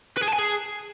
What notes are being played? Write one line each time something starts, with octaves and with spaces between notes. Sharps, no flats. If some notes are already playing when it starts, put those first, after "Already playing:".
B4
G#4
A5
G#5
G#4